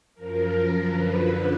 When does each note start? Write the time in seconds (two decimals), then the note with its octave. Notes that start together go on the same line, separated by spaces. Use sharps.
0.15 F#2 F3 A#4
0.83 F#2 D3 F3 B4